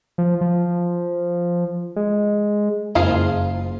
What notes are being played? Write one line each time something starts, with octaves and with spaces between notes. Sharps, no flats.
F3
F3
G#3
F#1 F3 A#3 F4 G#4